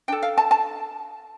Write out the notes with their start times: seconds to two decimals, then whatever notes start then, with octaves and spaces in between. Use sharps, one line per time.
0.08 D4 A4 G5
0.22 F5
0.38 A5
0.51 A5